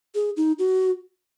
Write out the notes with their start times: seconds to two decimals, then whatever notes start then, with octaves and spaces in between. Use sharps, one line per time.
0.15 G#4
0.37 D#4
0.59 F#4